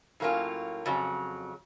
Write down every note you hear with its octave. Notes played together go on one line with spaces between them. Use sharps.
A2 F#3 A#3 C#4 F4
F2 C#3 F#3